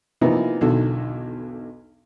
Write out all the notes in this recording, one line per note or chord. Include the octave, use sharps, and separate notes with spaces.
C3 E3 F3 A#3 B3 D#4
B1 E2 D3 D#3 F#4 A4